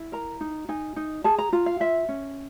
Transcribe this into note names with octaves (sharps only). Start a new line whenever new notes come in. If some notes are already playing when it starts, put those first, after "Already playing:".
Already playing: E4
A#4 A#5
D#4
D#4 G#5
D#4
G#4 A5
A#5
F4 A#5
F5
F4 E5
C#4